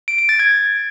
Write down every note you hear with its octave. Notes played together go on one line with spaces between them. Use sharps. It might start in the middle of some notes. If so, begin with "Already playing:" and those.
D7
D7
A6
G#6